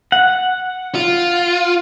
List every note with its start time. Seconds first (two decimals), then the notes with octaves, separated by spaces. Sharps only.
0.12 F#5
0.95 F4